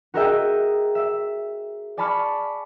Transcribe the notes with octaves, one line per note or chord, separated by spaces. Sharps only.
F#4 G#4 A#4 D#5 E5 G5
E5
D5 G#5 A5 B5 C#6 F6